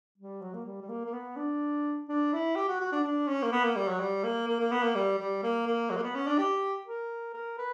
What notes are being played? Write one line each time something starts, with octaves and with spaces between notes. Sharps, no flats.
G3
F#3
A#3
G3
G3
A#3
A#3
B3
D4
D4
E4
G4
F#4
F#4
D4
D4
C#4
A#3
B3
A#3
G3
F#3
G3
A#3
A#3
A#3
B3
A#3
G3
G3
A#3
A#3
F#3
A#3
B3
C#4
D4
G4
A#4
A#4
B4